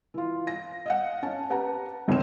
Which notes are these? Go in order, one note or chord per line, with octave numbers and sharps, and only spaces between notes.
E3 F4
A#6
D#5 F5 F#5
C#4 A5
G4 B4 F#5 A5 A#5
G1 C#2 D#3 C4 C#5 E7